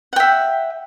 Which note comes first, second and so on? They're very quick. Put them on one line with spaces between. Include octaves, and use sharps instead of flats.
F#5 G5 E5